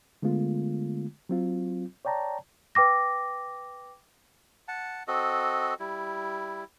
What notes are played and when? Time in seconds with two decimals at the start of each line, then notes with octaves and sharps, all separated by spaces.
0.22 D3 G#3 A3 B3 F4
1.29 F#3 C4 F4
2.05 C#5 D5 G5 A5 A#5
2.75 B4 G5 D6 A#6
4.68 F#5 A5
5.08 C4 F#4 A4 D#5
5.80 G3 E4